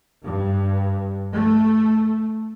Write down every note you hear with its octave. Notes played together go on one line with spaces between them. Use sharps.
G2
A3